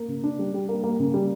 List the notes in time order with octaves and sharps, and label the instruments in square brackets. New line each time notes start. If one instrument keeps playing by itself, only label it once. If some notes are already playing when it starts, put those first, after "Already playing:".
Already playing: [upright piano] A#3
C#3
D4
G3
G3
A#3
A#3
C#3
G3